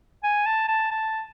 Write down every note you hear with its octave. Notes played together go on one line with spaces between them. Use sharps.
G#5
A5
A5
A5